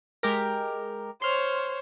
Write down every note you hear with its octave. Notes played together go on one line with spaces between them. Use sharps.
G#3 G4 A#4
C5 C#5 C6 F6